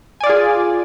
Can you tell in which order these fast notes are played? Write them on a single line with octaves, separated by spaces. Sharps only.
G#5 D5 F4 G#4